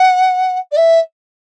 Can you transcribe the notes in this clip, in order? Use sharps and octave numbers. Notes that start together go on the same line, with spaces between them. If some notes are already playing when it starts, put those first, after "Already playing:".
Already playing: F#5
D5
E5